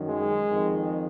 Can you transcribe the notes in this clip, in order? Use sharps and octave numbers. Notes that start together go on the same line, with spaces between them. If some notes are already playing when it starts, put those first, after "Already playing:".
Already playing: F#2 D#3
G#3
F2 D#3